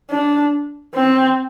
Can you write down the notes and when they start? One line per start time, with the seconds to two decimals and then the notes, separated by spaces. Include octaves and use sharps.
0.10 D4
0.95 C4